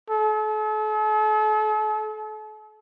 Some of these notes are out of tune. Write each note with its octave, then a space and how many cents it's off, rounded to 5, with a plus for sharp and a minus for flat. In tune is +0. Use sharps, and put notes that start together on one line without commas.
A4 -40